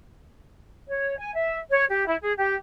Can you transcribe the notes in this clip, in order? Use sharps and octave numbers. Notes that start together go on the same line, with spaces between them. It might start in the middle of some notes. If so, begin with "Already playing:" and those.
C#5
G#5
E5
C#5
G4
E4
G#4
G4